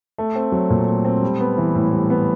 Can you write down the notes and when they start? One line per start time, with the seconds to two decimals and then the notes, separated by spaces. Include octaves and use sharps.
0.18 A3
0.35 C4
0.52 F#3
0.70 A#2
0.88 A3
1.05 C4
1.22 G3
1.40 B3
1.58 E3
1.75 A2
1.92 G3
2.10 B3